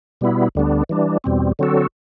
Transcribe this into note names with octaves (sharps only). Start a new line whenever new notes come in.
B2 G3 B3 E4
D2 D3 G3 B3 D4
E3 G3 D4
E2 B2 G3 C4
D3 F#3 C4 F#4 A4